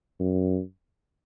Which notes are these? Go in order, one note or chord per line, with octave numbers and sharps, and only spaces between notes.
F#2